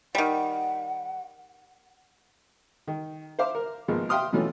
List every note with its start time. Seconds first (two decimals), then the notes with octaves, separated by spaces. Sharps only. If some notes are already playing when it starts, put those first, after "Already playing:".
0.15 D#3 G3 F#5
2.88 D#3
3.39 C5 E5 F5 D6
3.55 A#4
3.88 G#1 F3 G#3 A#3 B3
4.09 E5 F5 G5 C6 D#6 F6
4.33 B2 E3 F#3 A3 C#4 F4